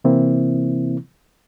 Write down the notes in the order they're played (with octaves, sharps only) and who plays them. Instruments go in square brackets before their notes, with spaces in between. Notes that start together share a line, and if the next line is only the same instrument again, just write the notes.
[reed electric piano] C3 E3 A#3 C4 E4